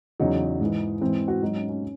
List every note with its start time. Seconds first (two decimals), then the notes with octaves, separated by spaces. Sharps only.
0.20 E2 C#3 F#3 D#4
0.61 G#2 E3
1.01 G#2 E3 C4
1.28 F#4
1.41 G#2 F#3 D#4
1.56 C#4
1.69 C#4